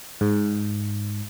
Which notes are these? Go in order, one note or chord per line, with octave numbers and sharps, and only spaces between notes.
G#2